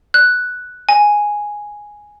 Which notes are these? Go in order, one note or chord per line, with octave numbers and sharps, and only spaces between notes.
F#6
G#5